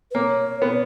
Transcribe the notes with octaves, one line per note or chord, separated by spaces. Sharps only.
B4
A#3 C#5
B3